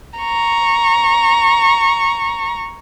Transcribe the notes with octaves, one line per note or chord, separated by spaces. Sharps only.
A#5 C#6